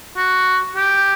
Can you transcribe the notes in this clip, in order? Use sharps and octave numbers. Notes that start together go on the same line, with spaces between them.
F#4
G4